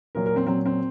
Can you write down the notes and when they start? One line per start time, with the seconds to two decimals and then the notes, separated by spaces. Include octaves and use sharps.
0.15 A#2 F#3 A#4
0.26 A#4
0.36 C4
0.46 A#2 F#3 C4
0.65 C4